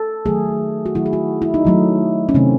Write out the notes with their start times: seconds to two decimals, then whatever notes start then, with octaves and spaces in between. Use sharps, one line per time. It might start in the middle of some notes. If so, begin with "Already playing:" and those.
Already playing: A4
0.26 D#3 F#3 A3 G#4
0.86 F#4
0.95 D#3 F#3 A3 E4
1.06 G#4
1.13 F#4
1.42 E4
1.54 D#4
1.65 D#3 F#3 A3
2.29 C#4
2.34 C3 D#3 A3 C4